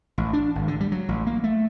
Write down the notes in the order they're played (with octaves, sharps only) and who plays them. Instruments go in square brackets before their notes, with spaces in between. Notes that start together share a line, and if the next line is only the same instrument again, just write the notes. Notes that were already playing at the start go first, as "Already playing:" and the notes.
[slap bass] A1
D4
G#1
D3
G3
F#3
A1
A#3
A3